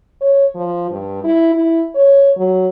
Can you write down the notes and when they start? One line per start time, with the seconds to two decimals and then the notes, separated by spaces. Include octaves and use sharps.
0.21 C#5
0.55 F3
0.91 G2
1.24 E4
1.54 E4
1.95 C#5
2.37 F#3